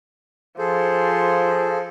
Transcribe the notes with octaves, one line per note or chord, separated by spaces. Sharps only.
F3 G#4 A4 C5